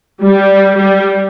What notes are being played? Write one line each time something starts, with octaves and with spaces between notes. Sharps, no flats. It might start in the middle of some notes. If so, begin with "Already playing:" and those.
G3
G3